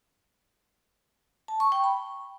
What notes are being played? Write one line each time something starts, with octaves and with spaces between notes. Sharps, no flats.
A5
C#6
G5
B5